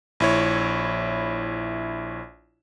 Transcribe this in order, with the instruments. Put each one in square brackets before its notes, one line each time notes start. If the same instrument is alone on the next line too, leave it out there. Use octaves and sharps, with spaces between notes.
[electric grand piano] A#1 E4 C#5